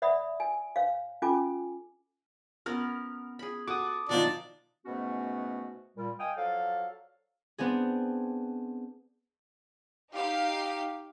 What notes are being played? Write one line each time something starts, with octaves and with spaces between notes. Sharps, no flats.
C#5 D5 E5 F#5 B5 D#6
G#5
C#5 F5
C#4 F4 A4 G#5 D6
B3 C#4 A#4 F6
G#4 B5
F#4 A4 D6 D#6
B2 D#3 F3 F#3 D4
G#2 B2 A3 B3 C#4 F#4
A#2 G3
D#5 F5 G5 G#5 D#6
F3 F#3 A4 D5 F5
B3 C4 D4 G#4
D#4 G4 F5